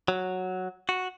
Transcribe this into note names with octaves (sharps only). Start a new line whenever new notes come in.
F#3
F#4